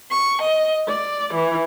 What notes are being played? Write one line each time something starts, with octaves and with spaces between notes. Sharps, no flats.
C#6
D#5
D5
E3